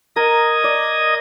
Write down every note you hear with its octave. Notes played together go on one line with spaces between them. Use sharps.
A#4 D#5 D#6 G#6
D5